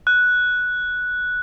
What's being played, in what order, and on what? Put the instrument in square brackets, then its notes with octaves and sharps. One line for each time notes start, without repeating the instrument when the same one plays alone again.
[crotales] F#6